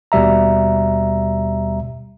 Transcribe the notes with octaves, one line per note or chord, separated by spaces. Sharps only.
D#2 B2 G3 E5 A#5